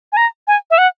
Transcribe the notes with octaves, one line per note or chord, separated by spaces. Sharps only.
G#5
A#5
G#5
E5
F#5